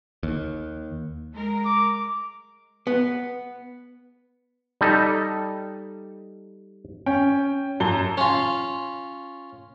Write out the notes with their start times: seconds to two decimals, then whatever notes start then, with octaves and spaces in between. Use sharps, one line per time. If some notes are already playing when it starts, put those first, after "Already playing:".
0.23 D#2
1.34 G#3 A#4
1.65 D6
2.87 B3
4.81 G3 D#4 A4
7.06 C#4 G5
7.80 F#2 A5 G7
8.17 C#4 F4